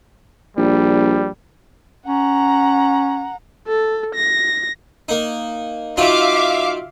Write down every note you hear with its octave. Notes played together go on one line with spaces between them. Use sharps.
A#1 G3
C#4 F#5 A#5
A4
A#6
A#3 D#4
F#3 D#4 F4 E5 F5 D6